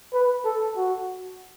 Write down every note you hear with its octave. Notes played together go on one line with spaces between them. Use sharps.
B4
A4
F#4